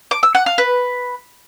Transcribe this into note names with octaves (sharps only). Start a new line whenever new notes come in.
D6
E6
F#5
F5
B4